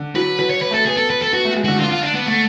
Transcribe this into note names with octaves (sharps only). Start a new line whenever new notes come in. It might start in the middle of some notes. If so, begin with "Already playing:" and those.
Already playing: D3
F#3 B4
F#3 B4
C#5
B4
A3 A4
B3 G#4
A4
B4
A4
B3 F#4
A3
G#3
D3 F#4
D3 F4
F4
D4
B3
A3